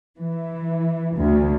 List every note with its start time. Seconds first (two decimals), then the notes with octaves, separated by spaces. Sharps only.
0.19 E3
1.17 D2